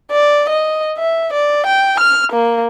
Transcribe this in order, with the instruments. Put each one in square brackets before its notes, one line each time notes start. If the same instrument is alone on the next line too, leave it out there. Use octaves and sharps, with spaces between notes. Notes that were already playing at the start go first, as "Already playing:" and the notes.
[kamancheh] D5
D#5
E5
D5
G5
F6
A#3